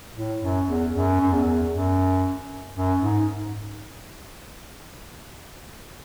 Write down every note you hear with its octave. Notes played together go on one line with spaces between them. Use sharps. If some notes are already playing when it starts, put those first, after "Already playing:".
A2
F#2
E2
F#2
F#2
E2
F#2
F#2
G#2